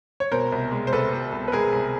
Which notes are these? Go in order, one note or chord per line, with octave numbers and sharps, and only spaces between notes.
C#5
B2 A#4 C5
C2
G#3
C5
C2 A4 B4
B2
C2
B4
G#3 G#4 A#4
C2